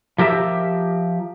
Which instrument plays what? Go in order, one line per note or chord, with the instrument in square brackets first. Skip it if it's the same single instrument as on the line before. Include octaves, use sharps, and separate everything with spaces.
[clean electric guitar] F3 G4 A#4 E5